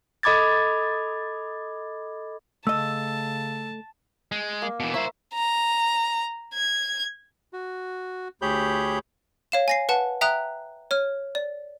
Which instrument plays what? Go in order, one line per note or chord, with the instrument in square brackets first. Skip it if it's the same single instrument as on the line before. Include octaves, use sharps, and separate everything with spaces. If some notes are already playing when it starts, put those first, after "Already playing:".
[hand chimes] A4 D#5 B5 D6 G#6 A6
[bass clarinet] C#3 [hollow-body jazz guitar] A3 D#5 [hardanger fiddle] A5 [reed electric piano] E6
[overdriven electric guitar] G#3
[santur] A#3
[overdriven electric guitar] B2 E3
[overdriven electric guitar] E4 C5 [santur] E5 A#5 C#6
[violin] A#5
G#6
[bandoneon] F#4
D2 G4 G#4 C#5 B5 G6
[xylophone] C#5 F5 E7
G#5 A#6 C7
B4 F#5 A5
E5 G5 A#5 D#6 F#6
C#5 F6
D5